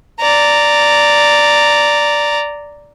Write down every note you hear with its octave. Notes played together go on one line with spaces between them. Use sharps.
D5 A#5